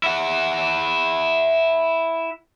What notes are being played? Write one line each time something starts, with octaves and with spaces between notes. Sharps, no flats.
E4 F#5